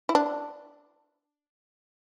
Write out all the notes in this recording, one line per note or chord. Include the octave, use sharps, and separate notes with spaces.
E4
D4